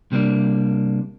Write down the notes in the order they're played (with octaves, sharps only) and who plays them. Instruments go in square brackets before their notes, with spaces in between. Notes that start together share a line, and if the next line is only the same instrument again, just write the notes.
[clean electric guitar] C3 G3 A#3 D4